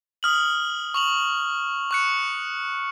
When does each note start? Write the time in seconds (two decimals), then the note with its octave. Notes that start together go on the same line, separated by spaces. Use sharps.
0.23 D#6 F6 F#7
0.94 C#6 F7 F#7
1.91 C#6 F#6 C#7